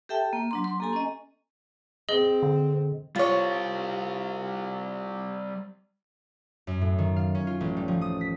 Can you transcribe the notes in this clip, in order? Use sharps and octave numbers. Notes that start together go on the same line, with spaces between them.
G4 A4 E5 G5 A5
A#3
F#3 D4 C6
C6
A#3 G4 A4 G#5 A#5
C#4 D#5
C4 G#4 D#5 G7
D3
G3 F4 C5 C#5
F#2
A2
D#3
F5
C#4
F4
A1
G3
F3
D#6
B6